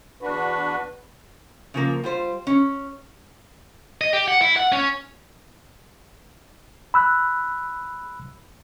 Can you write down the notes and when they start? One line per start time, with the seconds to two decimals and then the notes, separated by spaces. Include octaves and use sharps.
0.22 E2 D4 F#4 B4
1.74 C#3 F3 A#3
2.04 G3 F4 C5
2.47 C#4
4.01 D#5
4.13 G4
4.28 F#5
4.42 E4
4.57 F#5
4.72 C#4
6.94 B5 E6 F#6